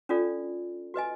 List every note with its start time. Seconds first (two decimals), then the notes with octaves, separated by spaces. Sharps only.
0.09 C#4 D4 F4 A4 D5
0.94 F#4 B4 D#5 G#5